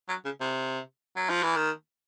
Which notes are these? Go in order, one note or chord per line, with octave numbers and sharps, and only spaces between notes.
F#3
C#3
C3
F#3
F3
E3
D#3